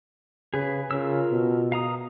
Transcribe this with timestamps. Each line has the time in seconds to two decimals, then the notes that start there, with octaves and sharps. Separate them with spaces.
0.54 C#3 G#4 B4
0.91 C#3 F4 A#4 E6
1.32 B2
1.72 F5 A#5 D#6